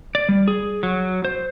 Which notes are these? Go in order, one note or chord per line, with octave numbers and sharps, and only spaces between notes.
D5
G3
G#4
F#3
C5